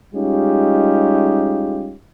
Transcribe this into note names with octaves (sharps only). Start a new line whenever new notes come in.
G3 G#3 C#4 D#4 F4 G4